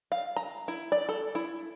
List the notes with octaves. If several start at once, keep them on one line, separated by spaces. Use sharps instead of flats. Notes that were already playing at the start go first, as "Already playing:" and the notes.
F5
A#5
E4
D5
A4
E4